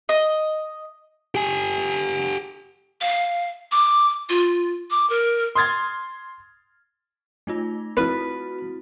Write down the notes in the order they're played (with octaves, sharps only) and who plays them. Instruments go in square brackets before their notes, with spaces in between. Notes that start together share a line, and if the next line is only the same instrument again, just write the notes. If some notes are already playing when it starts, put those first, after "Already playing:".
[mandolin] D#5
[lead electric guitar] G4 G#5
[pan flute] F5
D6
F4
D6
A#4
[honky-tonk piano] C6 D#6 F6 G#6 A6
[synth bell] A3 D#4 F4
[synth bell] C4 E4 F#4 [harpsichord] B4